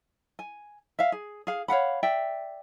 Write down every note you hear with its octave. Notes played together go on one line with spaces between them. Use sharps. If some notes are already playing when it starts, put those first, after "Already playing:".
G#5
E5 F5
G#4
G#4 F5
C#5 F5 F#5 B5
D5 E5 G5